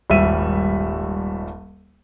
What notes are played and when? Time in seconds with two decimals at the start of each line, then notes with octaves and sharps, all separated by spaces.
0.10 D#1 G#1 G3 E5 D#7